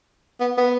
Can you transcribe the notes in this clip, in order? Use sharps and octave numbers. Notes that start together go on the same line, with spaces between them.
B3
B3